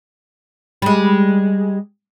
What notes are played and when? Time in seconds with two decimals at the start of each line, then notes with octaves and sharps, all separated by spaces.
0.82 G3 G#3